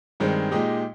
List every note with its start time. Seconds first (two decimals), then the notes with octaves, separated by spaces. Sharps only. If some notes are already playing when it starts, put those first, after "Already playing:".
0.20 G2 D#3 G#3 C4
0.51 A#2 G#3 D#4 G4